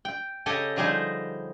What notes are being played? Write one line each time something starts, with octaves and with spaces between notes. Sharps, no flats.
G5
C#3 G4 A4 D#5 G#5
D3 F3 G3 D#4 G#4 C5